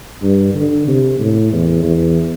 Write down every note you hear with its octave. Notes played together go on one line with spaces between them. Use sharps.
G2
D3
C3
A2
E2
E2